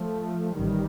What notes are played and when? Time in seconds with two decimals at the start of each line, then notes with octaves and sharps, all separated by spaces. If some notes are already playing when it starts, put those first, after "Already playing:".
Already playing: F3 A3
0.56 A1 D#3 G3